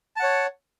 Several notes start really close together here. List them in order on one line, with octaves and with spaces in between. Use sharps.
A5 F#5 C#5